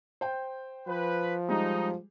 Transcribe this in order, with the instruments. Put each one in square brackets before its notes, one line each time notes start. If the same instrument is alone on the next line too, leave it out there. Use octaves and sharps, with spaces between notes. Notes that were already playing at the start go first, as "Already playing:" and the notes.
[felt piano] C5 G5
[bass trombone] F3 [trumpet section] B4
[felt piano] G3 G#3 [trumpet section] D#4